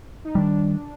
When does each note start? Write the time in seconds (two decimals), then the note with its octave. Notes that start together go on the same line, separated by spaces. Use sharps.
0.25 D#4
0.35 D#3 G3 D4